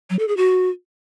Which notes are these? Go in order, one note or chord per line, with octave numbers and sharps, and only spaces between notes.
F#3
A4
G#4
F#4